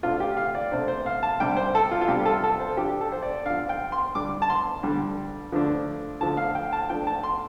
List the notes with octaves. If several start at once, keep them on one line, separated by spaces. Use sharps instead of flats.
C3 A3 D4 F4
G4
F5
D5
C3 A3 D4 C5
C5
F5
A5
C3 G3 D4 G5
C5
A4
F4
F4
C3 G3 D4 G4
A4
A4
C5
F3 D4 G4
A4
C5
D5
F3 D4 F5
G5
C6
D3 G3 D4 D6
A5
C6
D3 G3 D4
D3 F3 A3 D4
D3 F3 A3 D4 A5
F5
G5
A5
F3 A3 D4 G5
A5
C6